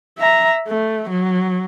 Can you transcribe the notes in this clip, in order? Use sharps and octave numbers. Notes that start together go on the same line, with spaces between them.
E5 A#5
A3
F#3